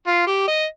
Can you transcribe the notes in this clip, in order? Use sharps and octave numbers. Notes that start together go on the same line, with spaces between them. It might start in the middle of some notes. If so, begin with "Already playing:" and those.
F4
G4
D#5